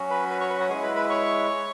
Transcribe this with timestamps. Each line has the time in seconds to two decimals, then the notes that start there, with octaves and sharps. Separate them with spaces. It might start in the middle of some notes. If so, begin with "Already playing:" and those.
Already playing: F#3 C#4 F#4
0.10 B4 B5
0.30 B4 B5
0.40 C#5 C#6
0.50 B4 B5
0.60 F#4 F#5
0.70 G#3 E4 G#4 G#5
0.83 B4 B5
0.96 B4 B5
1.10 C#5 C#6